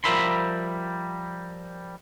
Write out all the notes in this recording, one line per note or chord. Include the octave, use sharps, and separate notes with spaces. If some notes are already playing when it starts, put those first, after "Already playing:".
F3 G3 A#4 E5 B5 C6